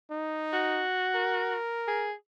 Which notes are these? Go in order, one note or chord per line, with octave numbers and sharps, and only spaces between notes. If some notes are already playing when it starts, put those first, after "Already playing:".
D#4
F#4
A#4
G#4